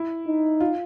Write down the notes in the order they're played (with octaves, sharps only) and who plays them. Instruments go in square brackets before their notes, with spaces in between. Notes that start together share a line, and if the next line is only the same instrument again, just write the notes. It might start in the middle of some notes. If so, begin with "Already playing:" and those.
Already playing: [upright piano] E4
[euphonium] D#4
[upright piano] F4